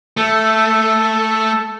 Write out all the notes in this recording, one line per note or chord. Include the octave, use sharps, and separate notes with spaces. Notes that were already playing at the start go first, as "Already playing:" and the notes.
A3 A4